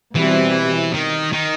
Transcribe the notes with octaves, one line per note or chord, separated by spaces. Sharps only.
B2 E3 G3 C4 E4
D#3
D#3